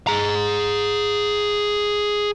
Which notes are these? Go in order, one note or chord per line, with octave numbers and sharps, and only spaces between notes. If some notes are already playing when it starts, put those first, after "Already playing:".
G#4 A#5